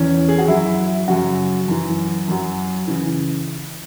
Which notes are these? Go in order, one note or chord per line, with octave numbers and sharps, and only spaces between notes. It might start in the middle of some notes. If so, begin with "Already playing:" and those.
Already playing: E2 E3 C#4
G#4
F#4
F#2 F#3 E4
F#2 C#3 F#3 F#4
F#2 E3
F#2 F#3
C#3 E3